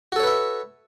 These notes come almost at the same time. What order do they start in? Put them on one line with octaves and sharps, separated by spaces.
F#4 A4 C#5 B4 E5